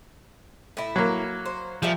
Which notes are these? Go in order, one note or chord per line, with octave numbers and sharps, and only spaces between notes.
A2 E4
F#3 A#3
C5
A#2 F3 G3 E5